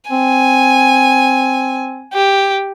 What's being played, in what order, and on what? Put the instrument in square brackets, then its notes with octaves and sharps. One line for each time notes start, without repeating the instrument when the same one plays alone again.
[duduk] C4 [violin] G#5
[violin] G4